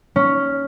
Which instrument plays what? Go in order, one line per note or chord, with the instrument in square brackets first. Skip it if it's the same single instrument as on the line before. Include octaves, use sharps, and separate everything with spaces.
[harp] C#4